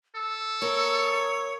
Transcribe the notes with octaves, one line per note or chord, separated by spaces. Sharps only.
A4 E6
A#3 A#4 C#5